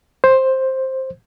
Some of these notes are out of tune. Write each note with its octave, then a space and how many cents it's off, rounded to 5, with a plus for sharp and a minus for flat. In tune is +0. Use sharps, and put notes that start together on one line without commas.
C5 +10